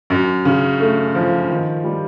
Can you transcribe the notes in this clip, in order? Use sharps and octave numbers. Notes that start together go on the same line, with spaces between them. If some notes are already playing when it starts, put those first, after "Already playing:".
F#2
C#3
A3
F3
D#3
G3